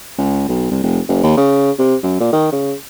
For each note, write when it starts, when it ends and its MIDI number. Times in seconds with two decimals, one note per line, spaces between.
0.18 0.46 37
0.48 0.71 35
0.71 0.80 36
0.83 1.00 29
1.08 1.20 30
1.23 1.37 39
1.37 1.71 49
1.79 1.96 48
2.03 2.19 42
2.20 2.32 46
2.33 2.48 51
2.52 2.74 49